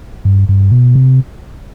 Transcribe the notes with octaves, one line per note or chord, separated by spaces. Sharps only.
G2
G2
B2
C3